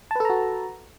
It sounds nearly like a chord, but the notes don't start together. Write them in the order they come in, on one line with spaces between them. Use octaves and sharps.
A5 B4 A4 A#5 F#4